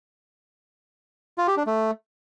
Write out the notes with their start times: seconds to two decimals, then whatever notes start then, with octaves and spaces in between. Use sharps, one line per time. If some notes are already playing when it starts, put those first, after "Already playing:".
1.38 F4
1.48 G4
1.57 D4
1.66 A3